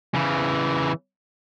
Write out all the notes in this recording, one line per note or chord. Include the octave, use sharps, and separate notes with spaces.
C#3 E3